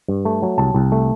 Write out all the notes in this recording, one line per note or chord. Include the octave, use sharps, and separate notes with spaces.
G2
A3
F#3
C2 A5
C2
A3